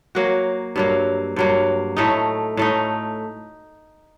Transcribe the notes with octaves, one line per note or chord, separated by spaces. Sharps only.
F#3 A#3 F#4
G2 F#3 A#3
G2 F#3 A#3
A2 A3 D#4
A2 A3 D#4